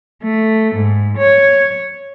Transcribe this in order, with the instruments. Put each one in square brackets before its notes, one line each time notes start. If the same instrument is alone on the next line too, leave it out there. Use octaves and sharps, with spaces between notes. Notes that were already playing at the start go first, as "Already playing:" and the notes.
[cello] A3
G#2
C#5